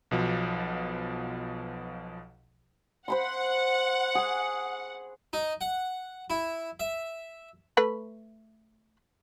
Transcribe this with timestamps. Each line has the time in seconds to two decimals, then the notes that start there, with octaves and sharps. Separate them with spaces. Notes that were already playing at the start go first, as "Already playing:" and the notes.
0.11 B1 B2 F3
3.08 C5 F#5 B5 C6
4.15 G#4 C#6
5.33 D#4
5.61 F#5
6.30 E4
6.80 E5
7.77 A3 B4 B5